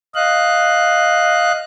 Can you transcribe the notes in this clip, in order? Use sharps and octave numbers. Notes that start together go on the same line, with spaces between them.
D#5 F5 F#6